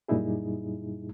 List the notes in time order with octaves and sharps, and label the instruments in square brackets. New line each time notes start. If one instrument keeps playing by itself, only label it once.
[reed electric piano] F#2 A#2 G3 D#4 E4 G#4